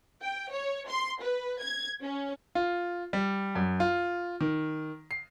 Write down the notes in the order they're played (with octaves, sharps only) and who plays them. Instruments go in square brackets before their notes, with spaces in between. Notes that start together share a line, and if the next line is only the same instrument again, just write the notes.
[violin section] G5
C#5
C6
B4
G#6
C#4
[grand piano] F4
G3
F#2
F4
D#3
C7